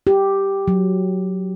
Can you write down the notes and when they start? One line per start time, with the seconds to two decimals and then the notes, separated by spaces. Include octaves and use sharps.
0.07 G4
0.68 F#3